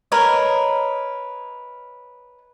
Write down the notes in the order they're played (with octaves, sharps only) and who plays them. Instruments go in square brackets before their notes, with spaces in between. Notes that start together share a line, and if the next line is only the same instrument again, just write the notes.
[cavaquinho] A#4 B4 C#5 D#5